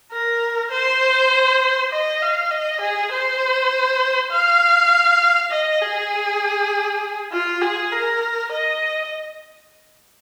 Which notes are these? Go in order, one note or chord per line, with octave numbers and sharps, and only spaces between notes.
A#4
C5
D#5
F5
D#5
G#4
C5
F5
D#5
G#4
F4
G#4
A#4
D#5